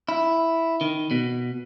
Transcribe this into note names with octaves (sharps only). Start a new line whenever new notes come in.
E4
D#3
B2